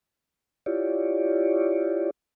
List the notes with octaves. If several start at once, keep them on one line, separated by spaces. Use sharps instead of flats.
E4 F4 G4 C#5 D5